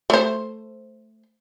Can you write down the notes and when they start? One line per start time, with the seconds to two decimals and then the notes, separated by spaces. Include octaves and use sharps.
0.10 A3 C5